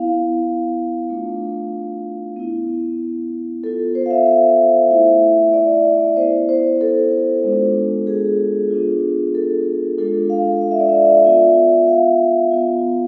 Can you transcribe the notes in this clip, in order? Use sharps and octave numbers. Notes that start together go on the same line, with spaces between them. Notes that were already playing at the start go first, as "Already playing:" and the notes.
Already playing: B3 E4 F5
A3 D4 F4
B3 E4
B3 F4 A4
C5
F5
E5
F5
A3 E4 E5
D5
B3 E4 C5
C5
A4
G#3 B3 D4 F4
G#4
B3 D4 F4
A4
G#3 D4 F4 A4
F5
F5
E5
D5
E5
B3 F4
F5
B3 F4